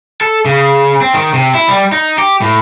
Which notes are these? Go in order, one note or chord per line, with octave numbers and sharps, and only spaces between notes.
A4
C#3
C4
D#3
C3
E4
G3
D#4
G4
A2